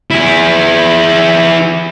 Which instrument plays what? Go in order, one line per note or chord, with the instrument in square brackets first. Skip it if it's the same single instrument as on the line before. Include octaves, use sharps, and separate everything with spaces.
[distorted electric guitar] E4 G#4